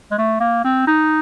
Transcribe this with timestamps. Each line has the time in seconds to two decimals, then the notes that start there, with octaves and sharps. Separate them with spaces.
0.11 G#3
0.18 A3
0.40 A#3
0.64 C4
0.87 D#4